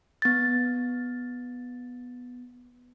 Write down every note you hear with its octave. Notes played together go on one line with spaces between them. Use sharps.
B3 A6